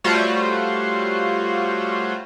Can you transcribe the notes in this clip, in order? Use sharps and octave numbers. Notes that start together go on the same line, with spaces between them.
G3 A3 F4 F#4 C5 C#5